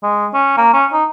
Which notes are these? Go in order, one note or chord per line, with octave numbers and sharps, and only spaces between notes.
G#3
C#4
A#3
C#4
D#4